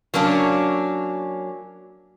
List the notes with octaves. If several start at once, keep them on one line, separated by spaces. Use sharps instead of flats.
F#3 A#3 C#4 D4